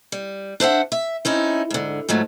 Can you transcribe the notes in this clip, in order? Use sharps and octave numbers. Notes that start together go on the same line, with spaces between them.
G3
D4 C5 E5 F#5
E5
C4 C#4 D#4 E4
G#2 D3
G#2 F3 F#3 A3